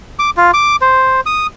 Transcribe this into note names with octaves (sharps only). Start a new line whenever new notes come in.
D6
F4
D6
C5
D#6